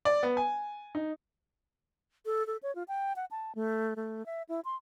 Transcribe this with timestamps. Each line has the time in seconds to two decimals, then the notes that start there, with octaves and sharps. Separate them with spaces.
0.05 D5
0.23 B3
0.37 G#5
0.95 D#4
2.26 A4
2.47 A4
2.63 C#5
2.75 F4
2.88 G5
3.16 F#5
3.31 A5
3.55 A3
3.96 A3
4.26 E5
4.49 E4
4.65 C6